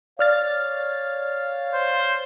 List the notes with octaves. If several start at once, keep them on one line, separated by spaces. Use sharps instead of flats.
C#5 D5 F5 F6 A6
C5